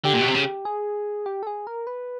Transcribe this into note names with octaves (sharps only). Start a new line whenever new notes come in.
D3 G4
A#2
B2
C3
C#3
G#4
G4
A4
G#4
A#4
B4